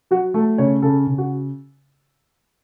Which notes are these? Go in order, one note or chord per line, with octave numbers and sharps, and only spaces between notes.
F#3 F#4
A3 A4
C#3 C#5
C#3 A4
C#3
F#4